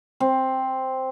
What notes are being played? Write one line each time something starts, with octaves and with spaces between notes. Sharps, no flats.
C4